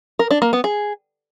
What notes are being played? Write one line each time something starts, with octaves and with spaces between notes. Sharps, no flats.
A#4
D4
A#3
B3
G#4